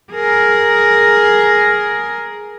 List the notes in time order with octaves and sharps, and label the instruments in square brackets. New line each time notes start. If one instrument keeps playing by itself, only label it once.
[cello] G#4 A#4